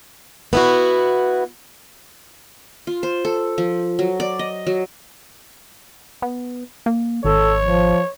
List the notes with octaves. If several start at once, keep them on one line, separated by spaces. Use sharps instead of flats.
B3 E4 F#4
F4
C5
A4
F3
F#3
D5
D#5
F#3
B3
A#3
G#1 A4 C#5
F3